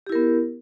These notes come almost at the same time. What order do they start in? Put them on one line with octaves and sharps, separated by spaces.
G4 E4 A#4 B3